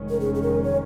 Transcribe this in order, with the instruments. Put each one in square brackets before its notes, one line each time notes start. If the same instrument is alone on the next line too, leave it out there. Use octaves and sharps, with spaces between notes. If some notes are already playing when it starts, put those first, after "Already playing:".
Already playing: [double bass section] F1 F2 D#3 G#3 C#4
[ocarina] A#4
G#4
G#4
A#4
C#5